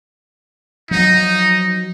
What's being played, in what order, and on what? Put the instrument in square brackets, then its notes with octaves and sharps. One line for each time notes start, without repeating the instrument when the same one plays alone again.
[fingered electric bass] F3 F#3 [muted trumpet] D#4